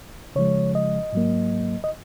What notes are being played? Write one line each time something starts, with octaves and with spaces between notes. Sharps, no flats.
C#3 F3 G#3 C#5
D#5
G#2 F#3 A#3
D#5